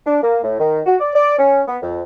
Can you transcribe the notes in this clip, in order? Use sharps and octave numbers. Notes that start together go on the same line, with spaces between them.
D4
A#3
A2
D#3
F#4
D5
D5
C#4
B3
F2